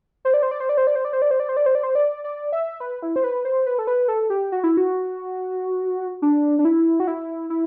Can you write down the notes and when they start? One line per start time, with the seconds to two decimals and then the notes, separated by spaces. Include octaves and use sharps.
0.25 C5
0.34 D5
0.42 C5
0.51 D5
0.60 C5
0.69 D5
0.77 C5
0.87 D5
0.95 C5
1.05 D5
1.13 C5
1.22 D5
1.31 C5
1.40 D5
1.49 C5
1.57 D5
1.66 C5
1.75 D5
1.83 C5
1.95 D5
2.24 D5
2.52 E5
2.80 B4
3.02 E4
3.16 C5
3.24 B4
3.45 C5
3.66 B4
3.79 A4
3.87 B4
4.08 A4
4.30 G4
4.52 F#4
4.64 E4
4.77 F#4
6.22 D4
6.59 D4
6.65 E4
7.00 F#4
7.07 E4
7.50 E4